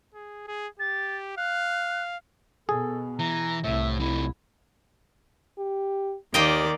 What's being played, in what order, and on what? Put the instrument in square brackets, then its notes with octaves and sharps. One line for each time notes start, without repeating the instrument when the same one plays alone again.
[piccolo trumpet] G#4
G#4
[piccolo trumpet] G4 [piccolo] A6
[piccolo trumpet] F5 [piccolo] F#6
[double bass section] B2 [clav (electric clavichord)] G#4 [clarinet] A4
[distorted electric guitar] E3 [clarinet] A#5
[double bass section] C2 [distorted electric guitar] A2 [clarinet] E5
[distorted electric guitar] C3 A3 [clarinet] E4
[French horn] G4
[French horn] D#2 [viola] D#3 D5 [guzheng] A#3 D#5 G5